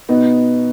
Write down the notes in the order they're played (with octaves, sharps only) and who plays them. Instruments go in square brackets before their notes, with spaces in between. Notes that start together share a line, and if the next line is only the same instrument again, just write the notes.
[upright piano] B2 B3 D#4